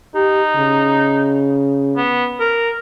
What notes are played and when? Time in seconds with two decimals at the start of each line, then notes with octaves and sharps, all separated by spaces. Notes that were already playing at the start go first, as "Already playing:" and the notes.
0.15 D#4 G4
0.56 C#3
1.97 B3
2.40 A#4